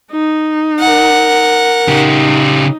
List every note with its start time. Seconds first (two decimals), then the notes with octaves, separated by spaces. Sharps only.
0.12 D#4
0.80 A#4 F#5
1.88 C#3 D#4 G4